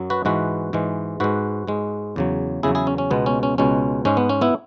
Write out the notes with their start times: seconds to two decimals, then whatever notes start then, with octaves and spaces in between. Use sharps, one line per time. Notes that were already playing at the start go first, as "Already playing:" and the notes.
Already playing: F#2 F#3
0.10 F#4 B4
0.25 G#2 E3 G#3 F#4 B4
0.73 G#2 E3 G#3
1.20 G#2 G#3 F#4 B4
1.67 G#2 G#3
2.16 E2 C#3 F#3
2.63 E2 C#3 F#3 E4 G#4
2.75 E4 G#4
2.87 C#4
2.98 C#4
3.11 C#2 B2 G#3 B3
3.26 C#4
3.43 C#4
3.58 C#2 B2 G#3 C#4
4.05 G#2 G#3 C#4
4.17 B3
4.29 C#4
4.41 B3 E4